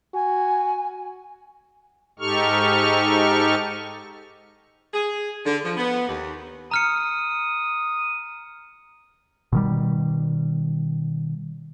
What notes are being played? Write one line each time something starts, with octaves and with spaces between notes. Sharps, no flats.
F#4 G#5
G#2 D#4 G4 A4 C#6 F6
G#4
D3
F3
B3
D#2
A#5 D#6 F6 C#7
B2 D#3 G3